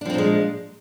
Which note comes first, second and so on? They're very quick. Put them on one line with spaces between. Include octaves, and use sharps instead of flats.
D4 F3 C4 A#2 G#3